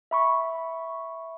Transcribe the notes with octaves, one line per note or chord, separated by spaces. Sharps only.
E5 B5 C#6